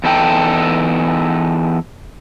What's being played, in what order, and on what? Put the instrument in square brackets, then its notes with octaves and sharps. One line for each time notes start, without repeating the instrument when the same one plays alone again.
[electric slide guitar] E2 D#4 A4 G5